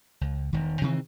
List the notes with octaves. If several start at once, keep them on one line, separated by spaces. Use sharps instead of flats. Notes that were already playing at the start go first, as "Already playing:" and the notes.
C#2
E1 D#3
C3 D#3 E3 C4